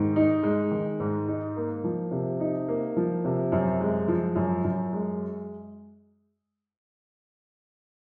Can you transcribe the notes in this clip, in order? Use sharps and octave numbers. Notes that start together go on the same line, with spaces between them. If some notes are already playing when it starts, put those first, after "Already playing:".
Already playing: G#2 D#3
D#4
G#3
D#3
G#2
D#4
A#3
F3
C3
D#4
A#3
F3
C3
F#2
G#3
F3
F#2
F#2
G#3